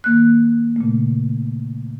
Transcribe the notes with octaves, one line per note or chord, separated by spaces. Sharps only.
D#3 A#3 F#6
A#2 C#3 A3